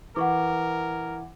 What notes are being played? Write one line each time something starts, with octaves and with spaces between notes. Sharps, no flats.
E3 A#4 F#5 C#6 D6